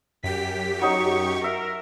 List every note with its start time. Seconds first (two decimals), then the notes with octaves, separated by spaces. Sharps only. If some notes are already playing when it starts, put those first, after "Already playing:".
0.24 F#2 G4 B6
0.81 F#3 D#4 D#5 C#6
1.44 A#4 E5